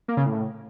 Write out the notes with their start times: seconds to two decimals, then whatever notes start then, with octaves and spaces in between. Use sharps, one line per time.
0.08 A#3
0.17 C#3
0.26 A2